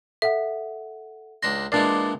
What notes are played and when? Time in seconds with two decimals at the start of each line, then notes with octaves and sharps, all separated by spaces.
0.22 A4 E5 F#5
1.43 C#2 D4 C6 A#6
1.72 A#2 E3 G#3 D4 D5 A6 C7